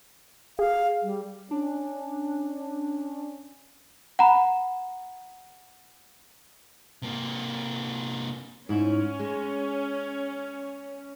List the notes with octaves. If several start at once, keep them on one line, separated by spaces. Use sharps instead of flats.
G#4 F5
G3
C#4 D4
F#5 A#5 B5
C3 A#3
G#2 C#4 E4
G#3